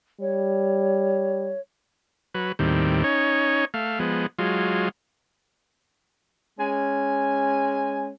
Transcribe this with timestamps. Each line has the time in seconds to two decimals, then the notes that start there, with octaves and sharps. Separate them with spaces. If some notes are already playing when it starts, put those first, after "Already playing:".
0.20 G3 C#5
2.34 F#3 B4
2.59 D#2 A2 D#3 G3 C4
3.04 C#4 D#4 C#5
3.74 A3 F5
4.00 F3 G#3 B3
4.39 F#3 G#3 F4
6.59 G#3 C#4 G#5